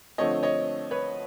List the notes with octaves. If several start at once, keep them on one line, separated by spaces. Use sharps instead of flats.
D3 F3 A3 C4 C#5 D#5
C#5 D#5
B4 C#5